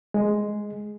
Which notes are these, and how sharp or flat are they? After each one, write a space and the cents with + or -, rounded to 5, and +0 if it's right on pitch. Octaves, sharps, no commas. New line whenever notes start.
G#3 +5